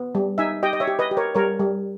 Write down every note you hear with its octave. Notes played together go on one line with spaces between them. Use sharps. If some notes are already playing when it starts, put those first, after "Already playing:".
Already playing: B3
G3
D#4 E5 G#5
G4 D#5 G5
D#5
C#5 E5
G4
B4 D#5
G4
A#4 C#5
G3 A#4 C#5
G3